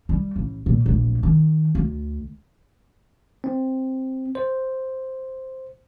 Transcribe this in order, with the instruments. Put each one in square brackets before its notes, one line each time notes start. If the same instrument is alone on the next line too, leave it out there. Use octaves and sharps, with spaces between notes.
[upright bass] G3
A1
A#2
D1 A#1
D#3
D2
[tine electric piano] C4
C5